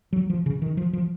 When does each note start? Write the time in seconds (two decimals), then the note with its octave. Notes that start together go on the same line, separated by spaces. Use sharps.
0.13 F#3
0.30 F3
0.46 C#3
0.62 D#3
0.77 F3
0.93 F3